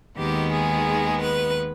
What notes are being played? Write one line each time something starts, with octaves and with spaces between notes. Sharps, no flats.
D#2 D#3 G#3 B3 G4
G#4
B4